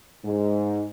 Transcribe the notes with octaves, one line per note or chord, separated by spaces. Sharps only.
G#2